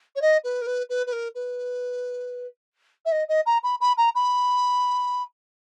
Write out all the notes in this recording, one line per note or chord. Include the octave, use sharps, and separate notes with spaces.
C#5
D#5
B4
A#4
B4
B4
B4
A#4
B4
E5
D#5
D#5
A#5
B5
B5
A#5
B5